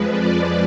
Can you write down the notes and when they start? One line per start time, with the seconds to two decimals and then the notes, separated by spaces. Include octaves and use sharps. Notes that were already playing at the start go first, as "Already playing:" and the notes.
Already playing: F2 F3 G#3 B4
0.10 D5